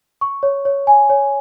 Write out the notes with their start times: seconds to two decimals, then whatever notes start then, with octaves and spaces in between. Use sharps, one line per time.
0.21 C#6
0.43 C#5
0.65 C#5
0.87 G#5
1.09 C#5